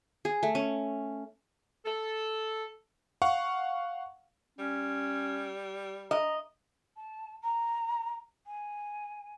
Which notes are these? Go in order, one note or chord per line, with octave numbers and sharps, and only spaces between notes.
G#4
A3
C#4
A4
F5 F#5 C#6
G3 C#4
D#5 A#5
A5
A#5
G#5